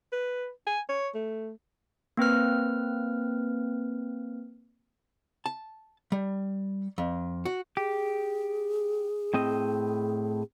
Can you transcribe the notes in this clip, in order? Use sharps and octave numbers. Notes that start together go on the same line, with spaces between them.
B4
G#5
C#5
A3
A#3 C4 B4 F6
A5
G3
F2
F#4
G4 G#4
A2 C4 D#5